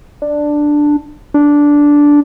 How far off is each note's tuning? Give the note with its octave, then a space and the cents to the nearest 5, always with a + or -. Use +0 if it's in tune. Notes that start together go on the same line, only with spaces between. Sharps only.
D4 +5
D4 -10